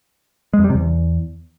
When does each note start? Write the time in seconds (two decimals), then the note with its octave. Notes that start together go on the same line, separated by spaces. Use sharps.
0.53 G#3
0.59 F2
0.64 G3
0.70 C3
0.75 E2